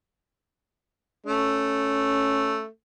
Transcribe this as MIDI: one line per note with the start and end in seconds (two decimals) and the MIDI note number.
1.26 2.66 57
1.26 2.62 61